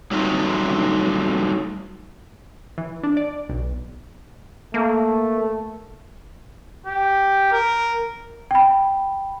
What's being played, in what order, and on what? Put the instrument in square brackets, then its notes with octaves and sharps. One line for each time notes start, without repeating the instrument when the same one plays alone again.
[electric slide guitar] F#3 G3 A3 D#4 F4
[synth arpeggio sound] E3
D4
D5
B1
[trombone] A3 [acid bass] A#3
[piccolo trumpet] G4
A#4
[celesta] G5 B5